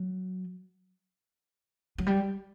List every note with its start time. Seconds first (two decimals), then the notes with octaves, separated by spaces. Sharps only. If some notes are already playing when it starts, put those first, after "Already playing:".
Already playing: F#3
1.98 F#3
2.07 G3